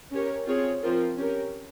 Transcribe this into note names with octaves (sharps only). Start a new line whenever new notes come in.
C#4 G4 A#4 C#5
C4 F4 G#4 C#5
F3 C4 F4 A#4
C#4 G4 A#4